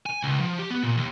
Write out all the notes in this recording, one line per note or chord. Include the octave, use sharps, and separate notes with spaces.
G#5
C#2
F3
G4
B3
A#2
D#2